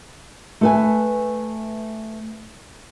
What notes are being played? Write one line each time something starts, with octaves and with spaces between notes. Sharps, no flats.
A3 B4 G#5